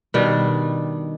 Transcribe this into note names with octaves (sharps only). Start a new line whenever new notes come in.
B2 D#3 G3 D4